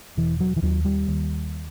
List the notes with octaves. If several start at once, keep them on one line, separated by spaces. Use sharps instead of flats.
E1 E3
F#3
E3
D#2 F#3
G3
D#2